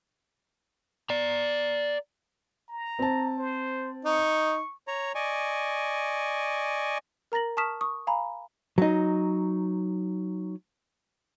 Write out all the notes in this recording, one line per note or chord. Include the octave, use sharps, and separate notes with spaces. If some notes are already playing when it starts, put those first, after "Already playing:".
D5 A#5
A#5
C4 A5
C5
D#4 C#6
C#5 A#5
D5 D#5 G#5 C#6
A#4 A#5 A6 A#6 F#7
A5 C#6 D#6 F6 B6 E7
C#6 D#6
F5 G#5 A#5 B5
F#3 D#4